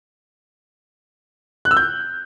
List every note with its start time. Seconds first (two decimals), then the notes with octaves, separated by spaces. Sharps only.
1.65 F#6
1.71 E6
1.77 G6